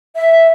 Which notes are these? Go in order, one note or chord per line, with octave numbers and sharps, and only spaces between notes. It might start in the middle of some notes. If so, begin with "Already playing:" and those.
E5